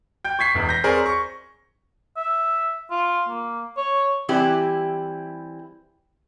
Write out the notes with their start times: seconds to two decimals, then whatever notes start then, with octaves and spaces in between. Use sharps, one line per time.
0.25 G5 G6
0.39 C#6 G#6 B6 C7
0.55 E1 E2
0.69 G6 A#6
0.84 C4 G#4 A#4 C#5 D5
1.06 C#6
2.17 E5
2.90 F4
3.29 A#3
3.77 C#5
4.29 E3 G3 C4 E4 G4 B4